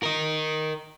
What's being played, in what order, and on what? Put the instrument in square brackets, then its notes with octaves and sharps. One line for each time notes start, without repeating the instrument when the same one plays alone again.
[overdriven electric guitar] A#4 D#5